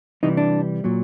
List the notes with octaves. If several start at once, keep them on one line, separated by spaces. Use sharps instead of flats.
C3 E3 G3 D#4
D4
A#2 F#3